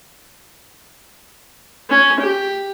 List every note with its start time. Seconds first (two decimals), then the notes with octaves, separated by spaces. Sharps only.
1.90 C#4
2.21 G4